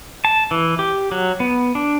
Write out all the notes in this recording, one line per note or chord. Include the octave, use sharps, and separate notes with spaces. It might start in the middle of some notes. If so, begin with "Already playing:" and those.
A5
E3
G4
F#3
B3
D4